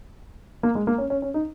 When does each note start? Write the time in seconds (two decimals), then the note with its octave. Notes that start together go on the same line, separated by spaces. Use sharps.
0.63 A#3
0.75 G#3
0.87 A#3
0.98 C#4
1.10 C#4
1.22 C#4
1.34 D#4